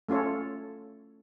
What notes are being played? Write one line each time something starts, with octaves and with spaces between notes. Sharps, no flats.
A3 C#4 F4 A4 C#5